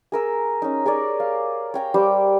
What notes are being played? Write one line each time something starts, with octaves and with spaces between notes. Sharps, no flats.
G#4 A#4 E6
C#4 D#4
G#4 A#4 C#5 D5
F5
C#5 G5 A#5
G3 C5 D6